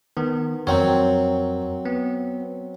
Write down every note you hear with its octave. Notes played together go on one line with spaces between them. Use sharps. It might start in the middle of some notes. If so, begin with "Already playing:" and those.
D#3 B3
F2 F#3 C4 A#4 C#5
B3